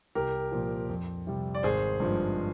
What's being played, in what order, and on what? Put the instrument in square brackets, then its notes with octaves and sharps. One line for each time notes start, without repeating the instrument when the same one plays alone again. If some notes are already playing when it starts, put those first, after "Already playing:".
[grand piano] C2 G4 A#4
A#2 F3
F2
C3 G3
D5
G#1 G#4 C5
G2 F3 G#3